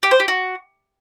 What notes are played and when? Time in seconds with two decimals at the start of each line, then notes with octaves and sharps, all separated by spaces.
0.03 G4
0.11 C5
0.20 G4
0.28 F#4